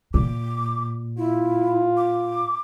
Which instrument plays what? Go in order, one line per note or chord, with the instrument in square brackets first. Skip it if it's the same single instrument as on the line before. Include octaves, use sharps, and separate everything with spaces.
[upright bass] A#2 [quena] D6
[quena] E4 [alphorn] F4
[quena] D6